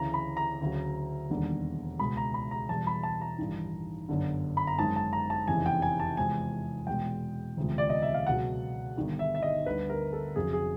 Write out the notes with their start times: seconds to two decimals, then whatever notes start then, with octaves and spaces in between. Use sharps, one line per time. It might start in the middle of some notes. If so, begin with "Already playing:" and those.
Already playing: D2 C#3 E3 A#5
0.14 B5
0.37 A#5
0.61 D2 C#3 F#3
1.30 E1 D#2 D3 G3
1.99 C#2 B2 G#3 B5
2.17 A#5
2.34 B5
2.51 A#5
2.69 E2 B2 G3 A5
2.87 B5
3.03 A5
3.21 A#5
3.38 A1 G2 D#3
4.09 G1 F#2 D3
4.57 B5
4.67 A#5
4.78 G#1 F#2 D#3 G#3 A5
4.96 A5
5.13 A#5
5.30 A5
5.47 F1 E2 C#3 E3 G#5
5.66 G5
5.82 G#5
6.00 A5
6.17 E2 C3 F3 G#3 G#5
6.87 E2 B2 G#3 G5
7.57 E1 D2 C3 F3 G#3
7.78 D5
7.90 D#5
8.02 E5
8.14 F5
8.27 C#2 B2 F#3 F#5
8.96 G1 G2 D#3 G3
9.19 E5
9.35 E5
9.43 D#5
9.66 D2 D3 G3 B4
9.90 A#4
10.13 A4
10.36 F1 F2 C#3 F#3 G#4
10.53 G#4